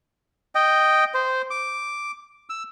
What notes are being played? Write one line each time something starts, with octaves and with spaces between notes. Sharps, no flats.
D#5 G5
C5
D6
E6